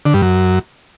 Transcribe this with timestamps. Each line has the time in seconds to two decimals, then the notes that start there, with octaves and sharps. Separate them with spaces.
0.06 D3
0.14 G2
0.22 F#2